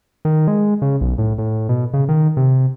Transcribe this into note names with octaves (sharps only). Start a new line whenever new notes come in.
D#3
G#3
C#3
B1
A2
A2
B2
C#3
D#3
C3